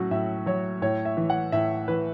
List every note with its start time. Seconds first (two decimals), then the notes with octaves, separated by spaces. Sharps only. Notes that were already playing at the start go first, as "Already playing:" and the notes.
Already playing: A2 F#3 C#4 F#4
0.11 A2 E5
0.46 F#3 C#5
0.82 A2 C#5
1.05 E5
1.17 E3
1.30 F#5
1.52 A2 E5
1.88 E3 B4